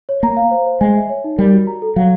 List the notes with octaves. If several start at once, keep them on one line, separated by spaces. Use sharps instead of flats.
C#5
A#3 A#5
F5
C5
C5
G#3 G#5
E5
C#5
D#4
G3 A#4
F#4
A#5
A4
F#3 F5